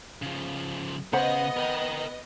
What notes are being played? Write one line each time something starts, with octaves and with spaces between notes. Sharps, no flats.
C#3 F3
C#3 B3 C5 D#5 F#5 B5
A#4 G5